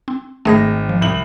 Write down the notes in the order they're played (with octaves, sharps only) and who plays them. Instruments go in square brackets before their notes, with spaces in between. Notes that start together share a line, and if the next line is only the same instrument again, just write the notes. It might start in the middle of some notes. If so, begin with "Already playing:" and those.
[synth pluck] C4
[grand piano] G#1 [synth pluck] A3 G#4 A#6
[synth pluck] F3
[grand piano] C2 F#7